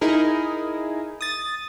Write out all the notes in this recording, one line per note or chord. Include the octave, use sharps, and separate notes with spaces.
D#4 E4 G#4 A#4
D#6 A6